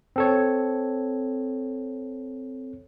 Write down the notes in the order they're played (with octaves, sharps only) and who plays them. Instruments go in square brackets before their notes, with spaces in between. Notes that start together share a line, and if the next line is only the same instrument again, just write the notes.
[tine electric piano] C4 A4 C#5